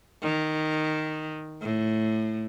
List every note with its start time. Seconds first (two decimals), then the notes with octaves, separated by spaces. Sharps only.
0.23 D#3
1.62 A2